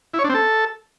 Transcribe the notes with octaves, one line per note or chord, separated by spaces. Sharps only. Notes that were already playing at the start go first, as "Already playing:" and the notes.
E4
C#5
D4
C4
A4